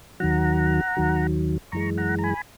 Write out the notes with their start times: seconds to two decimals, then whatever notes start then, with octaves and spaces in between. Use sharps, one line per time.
0.20 D#2 D#3 F#3 F#5 A#5
0.97 D#2 D#3 F#3
1.72 F#2 E3 G#3 A#5 C#6
1.98 F#5 A#5
2.19 A#5
2.24 G#5 B5